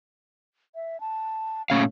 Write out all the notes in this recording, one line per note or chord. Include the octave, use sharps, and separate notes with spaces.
E5
A5
A#2 A3 C#4 F5